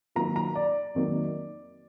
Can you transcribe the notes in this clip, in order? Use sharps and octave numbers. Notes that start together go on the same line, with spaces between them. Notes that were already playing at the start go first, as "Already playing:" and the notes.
D#3 F#3 A#3 F4 A#5
A#5
D5
F2 D#3 F#3 A#3